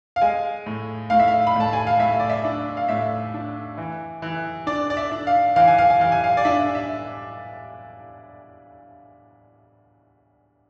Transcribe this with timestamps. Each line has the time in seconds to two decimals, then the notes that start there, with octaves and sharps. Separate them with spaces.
0.16 F5
0.21 G#3 G#5
0.66 A2
1.10 A2 F5
1.20 E5
1.28 F5
1.47 B5
1.56 A2 A5
1.73 G#5
1.87 F5
1.99 A2 E5
2.20 D5
2.30 E5
2.44 D4
2.77 F5
2.89 A2 E5
3.34 D4
3.78 E3
4.22 E3
4.67 D4 D5
4.90 D5
4.97 E5
5.11 D4
5.27 F5
5.56 E3 F5
5.68 G#5
5.78 F5
5.90 G#5
6.00 E3 F5
6.12 G#5
6.24 F5
6.37 D5
6.45 D4 E5
6.75 E5